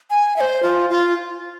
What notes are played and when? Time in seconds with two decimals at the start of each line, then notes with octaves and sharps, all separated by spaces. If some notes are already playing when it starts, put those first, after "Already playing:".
0.10 G#5
0.36 E5
0.41 C5
0.63 F4
0.90 F4